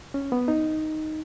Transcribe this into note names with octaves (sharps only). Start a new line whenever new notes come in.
C#4
B3
D#4